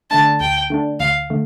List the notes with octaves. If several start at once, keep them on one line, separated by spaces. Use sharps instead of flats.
D3 A3 D4 A5
D2 G5
D3 A3 D4
D2 F5
D3 A3